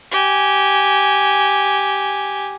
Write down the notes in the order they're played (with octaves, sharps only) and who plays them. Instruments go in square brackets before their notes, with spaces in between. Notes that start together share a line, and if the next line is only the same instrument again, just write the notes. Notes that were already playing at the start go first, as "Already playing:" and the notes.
[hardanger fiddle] G4 G#5